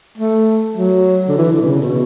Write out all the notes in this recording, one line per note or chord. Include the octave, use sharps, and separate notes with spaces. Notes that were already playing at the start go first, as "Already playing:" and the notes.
A3
F#3
D3
E3
D3
B2
C#3
B2